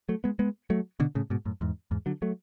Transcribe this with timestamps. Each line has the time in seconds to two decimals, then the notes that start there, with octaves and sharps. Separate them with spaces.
0.09 F#3 A3
0.24 G#3 B3
0.39 G#3 B3
0.70 F#3 A3
1.00 B2 D3
1.15 A2 C#3
1.30 G#2 B2
1.46 F#2 A2
1.61 E2 G#2
1.91 E2 G#2
2.06 D3 F#3
2.22 F#3 A3